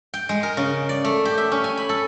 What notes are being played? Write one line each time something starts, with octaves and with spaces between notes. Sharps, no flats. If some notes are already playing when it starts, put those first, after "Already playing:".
G5
G#3
A#4
C#3
D5
A3
G4
E5
C#4
G#5
B5
A4